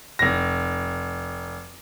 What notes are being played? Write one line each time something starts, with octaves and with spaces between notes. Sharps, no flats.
F1 A#6